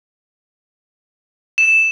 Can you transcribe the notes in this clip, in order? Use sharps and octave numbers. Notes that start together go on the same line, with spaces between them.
E7